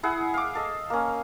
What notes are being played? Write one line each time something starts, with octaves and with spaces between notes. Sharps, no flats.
E4 G#4 F#5
F5 D6
A4 D#5
A#3 C#4